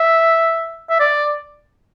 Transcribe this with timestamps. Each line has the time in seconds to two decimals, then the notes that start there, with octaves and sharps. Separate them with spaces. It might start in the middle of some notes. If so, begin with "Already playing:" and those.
Already playing: E5
0.90 E5
1.00 D5